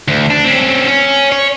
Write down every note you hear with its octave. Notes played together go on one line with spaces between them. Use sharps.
D2
D4
C4 C#4
C#4
C#5